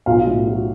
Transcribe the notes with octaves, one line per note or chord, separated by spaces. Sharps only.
B1 F4 F5
A2
F#3